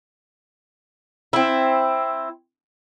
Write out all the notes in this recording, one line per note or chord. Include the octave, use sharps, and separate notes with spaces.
C4 E4